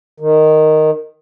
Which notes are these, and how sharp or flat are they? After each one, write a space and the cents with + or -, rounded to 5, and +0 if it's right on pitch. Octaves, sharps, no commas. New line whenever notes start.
D#3 -5